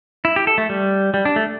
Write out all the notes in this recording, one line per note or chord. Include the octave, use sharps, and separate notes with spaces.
E4
G4
A4
A3
G3
G3
D4
A3